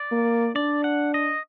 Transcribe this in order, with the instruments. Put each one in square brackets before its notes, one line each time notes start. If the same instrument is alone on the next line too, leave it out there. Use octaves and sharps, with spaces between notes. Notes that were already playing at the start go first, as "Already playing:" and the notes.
Already playing: [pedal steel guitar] D5
[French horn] A#3
[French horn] D4 [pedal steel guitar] D5
[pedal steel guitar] F#5
D#5